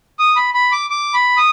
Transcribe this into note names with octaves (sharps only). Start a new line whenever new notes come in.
D#6
B5
B5
D6
D6
B5
D#6